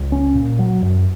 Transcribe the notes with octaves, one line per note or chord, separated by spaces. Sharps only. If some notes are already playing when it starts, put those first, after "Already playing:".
Already playing: C#2
C#4
A#2
F#3
F#2